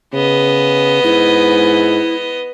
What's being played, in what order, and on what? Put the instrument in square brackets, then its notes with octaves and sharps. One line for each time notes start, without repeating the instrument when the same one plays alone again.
[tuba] C#3 [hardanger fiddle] B3 D#5
[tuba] G#2 [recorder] E4